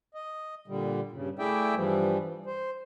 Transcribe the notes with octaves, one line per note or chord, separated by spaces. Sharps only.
D#5
A#2 D3 G3
G2 C#3
A3 E4 G#4 D5 E5 G5
G2 E3 F3 G3
C5